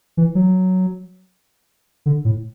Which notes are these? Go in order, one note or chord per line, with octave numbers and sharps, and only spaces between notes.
E3
F#3
D3
A2